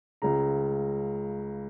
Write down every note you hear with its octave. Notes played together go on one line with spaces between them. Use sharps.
C#2 C#3 A#5